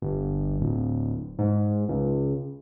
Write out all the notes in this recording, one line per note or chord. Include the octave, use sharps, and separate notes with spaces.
G1
D1
G#2
C#2